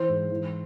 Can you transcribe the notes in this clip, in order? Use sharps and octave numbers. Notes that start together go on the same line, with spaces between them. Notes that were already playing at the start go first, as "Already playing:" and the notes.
Already playing: E3 C5
G#2
E3